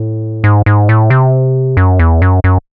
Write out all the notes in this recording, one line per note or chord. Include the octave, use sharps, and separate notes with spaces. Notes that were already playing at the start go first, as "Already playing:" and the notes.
Already playing: A2
G#2
G#2
A2
C3
F#2
E2
F#2
F#2